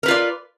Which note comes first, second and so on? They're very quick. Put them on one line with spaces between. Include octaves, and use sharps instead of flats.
A#4 B4 F4 D5